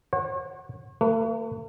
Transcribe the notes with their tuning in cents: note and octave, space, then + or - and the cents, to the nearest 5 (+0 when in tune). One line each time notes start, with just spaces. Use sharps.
C#5 -40 F#5 +0
A3 +45 B4 +0